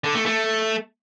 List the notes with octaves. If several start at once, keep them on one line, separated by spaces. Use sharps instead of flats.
D3
A3
A3